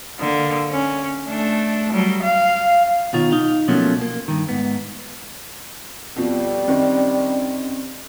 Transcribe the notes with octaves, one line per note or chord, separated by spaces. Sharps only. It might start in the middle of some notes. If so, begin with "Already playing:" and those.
D3 A#3
C#4
A3 D4
F#3 G3
F5
B2 D#3 F4 C#5
D#4 F5
B2 F3 F#3 A3 A#3 C#4
A#3
G2 D#3
G#2 B3
F2 B2 F3 G3
F#2 D#3 C4